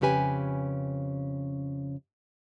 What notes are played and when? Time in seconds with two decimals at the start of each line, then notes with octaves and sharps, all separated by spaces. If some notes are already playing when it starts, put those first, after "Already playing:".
0.01 F2 C#3 C#4 G4 B4 G#5